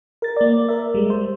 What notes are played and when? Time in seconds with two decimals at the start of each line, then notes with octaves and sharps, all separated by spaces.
0.22 A#4 A6
0.37 A#3 D5
0.68 A#4 E5
0.94 G3 G#3
1.10 C5